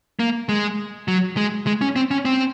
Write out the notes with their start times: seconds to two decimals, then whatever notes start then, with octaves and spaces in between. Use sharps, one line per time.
0.19 A#3
0.49 G#3
1.08 F#3
1.37 G#3
1.67 G#3
1.81 C#4
1.96 C4
2.11 C#4
2.25 C4